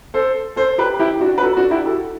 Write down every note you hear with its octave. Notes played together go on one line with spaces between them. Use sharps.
A4 C5
A4 C5
G4 B4
E4 G4
D4 F#4
B4
F#4 A4
D4 F#4
E4 G4
F#4 A4